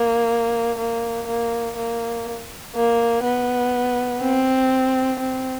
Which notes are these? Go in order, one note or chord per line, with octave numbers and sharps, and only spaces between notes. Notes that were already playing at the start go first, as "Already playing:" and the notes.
Already playing: A#3
A#3
A#3
A#3
A#3
B3
C4
C4